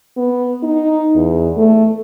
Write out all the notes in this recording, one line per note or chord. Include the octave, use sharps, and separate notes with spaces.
B3
D#4
E2
A3